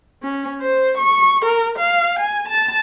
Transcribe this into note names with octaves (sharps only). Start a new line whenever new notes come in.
C#4
C5
C#6
A#4
F5
G#5
A5